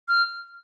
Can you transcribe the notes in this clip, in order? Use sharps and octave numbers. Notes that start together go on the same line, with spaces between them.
F6